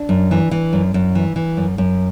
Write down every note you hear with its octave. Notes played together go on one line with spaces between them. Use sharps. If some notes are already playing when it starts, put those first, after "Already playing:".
Already playing: D4
F#2
E3
E3
F#2
F#2
E3
E3
F#2
F#2